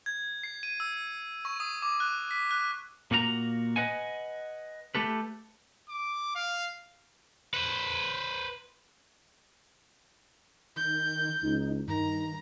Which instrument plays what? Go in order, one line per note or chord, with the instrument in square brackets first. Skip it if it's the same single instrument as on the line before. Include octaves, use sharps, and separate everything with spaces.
[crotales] G#6
C7
D#7
E6
C#6
D#6
D6
F#6
B6
F#6
[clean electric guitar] A#2 A#3 F#4 G#4 A#5
B4 D#5 F#5 G#5
A3 G4 A4 B4
[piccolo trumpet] D6
F5
[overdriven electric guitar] B4 C5
[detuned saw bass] D#3 [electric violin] G6
[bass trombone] C#2 [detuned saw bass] D#4
[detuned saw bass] G2 [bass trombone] D#3 [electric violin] A#5